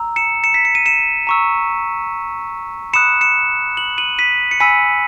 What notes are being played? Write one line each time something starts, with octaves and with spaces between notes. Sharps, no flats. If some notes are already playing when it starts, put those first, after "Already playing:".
Already playing: A#5 E6
C#7 E7
C#7 E7
B6
C#7
D#7
C#7 E7
A#5 C#6 E6
B5 D#6 F#6 C#7 E7
C#7 E7
F#7
D#7 F#7
B6 D#7
C#7
G#5 B5 E6 B6 D#7